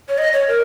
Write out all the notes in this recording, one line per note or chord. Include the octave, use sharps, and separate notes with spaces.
C#5
D#5
C#5
A#4